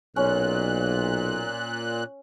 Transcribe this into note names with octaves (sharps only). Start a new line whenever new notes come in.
B1 A#2 C#4 F#6